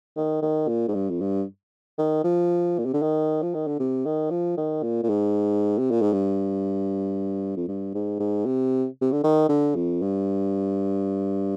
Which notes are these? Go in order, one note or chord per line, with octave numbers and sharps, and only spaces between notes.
D#3
D#3
A#2
G#2
G2
F2
G2
D#3
F3
A#2
C3
D3
D#3
F3
D#3
D3
C3
D#3
F3
D#3
A#2
A#2
G#2
C3
A#2
G#2
G2
F2
G2
G#2
G#2
C3
C3
D3
D#3
D3
F2
G2